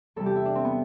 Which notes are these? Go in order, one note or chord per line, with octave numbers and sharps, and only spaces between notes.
E2 C3 G3 A4
G4
E4
D4
C4
B3